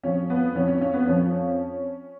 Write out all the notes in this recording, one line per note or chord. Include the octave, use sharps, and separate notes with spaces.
F2 F3 C#4
B3
F2 F3 C#4
C#4
C#4
B3
F2 F3 C#4